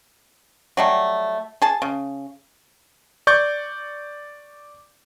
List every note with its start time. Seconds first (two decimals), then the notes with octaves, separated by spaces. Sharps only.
0.77 F#3 G3 A3
1.62 G#4 A5
1.82 C#3
3.27 D5 C#6 G6